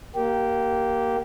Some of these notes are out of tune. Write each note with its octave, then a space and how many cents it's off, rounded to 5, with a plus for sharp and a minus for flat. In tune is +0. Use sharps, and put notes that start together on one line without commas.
A#3 +0 G4 -15